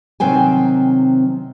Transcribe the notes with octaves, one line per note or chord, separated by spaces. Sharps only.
C3 D#3 F#3 C4 G5 G#5